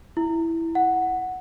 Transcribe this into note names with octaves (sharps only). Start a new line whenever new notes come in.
E4
F#5